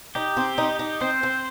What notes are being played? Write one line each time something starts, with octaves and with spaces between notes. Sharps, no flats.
D#4 G4
C4
D#4
D#4
C4 C5
C4